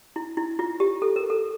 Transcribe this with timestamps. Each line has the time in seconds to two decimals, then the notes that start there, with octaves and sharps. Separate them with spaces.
0.16 E4
0.37 E4
0.59 F4
0.80 G4
1.02 A4
1.16 A#4
1.30 A4